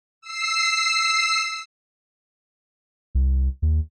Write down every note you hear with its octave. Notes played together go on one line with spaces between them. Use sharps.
E6 C7
C2
D#2